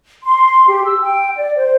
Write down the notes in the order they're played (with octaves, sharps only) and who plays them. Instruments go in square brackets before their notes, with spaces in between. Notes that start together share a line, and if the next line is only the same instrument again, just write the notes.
[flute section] C6
G4
E6
G5
D5
C5